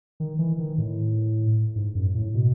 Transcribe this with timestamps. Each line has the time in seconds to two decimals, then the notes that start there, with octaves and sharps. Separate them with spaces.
0.20 D#3
0.39 E3
0.59 D#3
0.78 A2
1.76 G#2
1.95 F#2
2.15 A2
2.34 B2